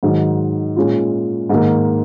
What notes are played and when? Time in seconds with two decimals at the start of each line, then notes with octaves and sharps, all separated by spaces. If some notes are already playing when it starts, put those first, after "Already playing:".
0.03 G#2 D#3 F#3
0.77 A#2 G#3 C#4 F4
1.49 G#2 D#3 A#3